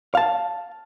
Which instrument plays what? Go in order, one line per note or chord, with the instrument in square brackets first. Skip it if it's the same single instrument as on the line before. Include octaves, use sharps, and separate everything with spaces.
[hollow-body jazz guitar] F5 A5